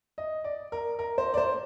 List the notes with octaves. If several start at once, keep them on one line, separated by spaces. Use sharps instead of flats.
D#5
D5
A#4
A#4
C5
D5
C5